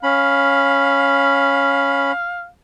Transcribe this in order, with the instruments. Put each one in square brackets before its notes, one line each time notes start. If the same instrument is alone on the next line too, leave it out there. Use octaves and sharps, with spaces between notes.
[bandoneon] C#4 B5 [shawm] F5